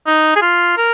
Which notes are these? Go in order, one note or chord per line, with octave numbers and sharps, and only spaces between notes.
D#4
G#4
F4
A#4